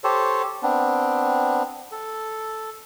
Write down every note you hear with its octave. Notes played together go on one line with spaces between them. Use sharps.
G4 A4 C5 C#5
B3 C4 D4
A4